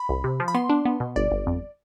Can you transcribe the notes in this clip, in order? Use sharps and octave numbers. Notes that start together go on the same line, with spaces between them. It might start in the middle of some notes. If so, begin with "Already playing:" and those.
Already playing: B5
C2
C3
F3
B5
B3 C6
D4
B3
B2
G1 D5
G1
F2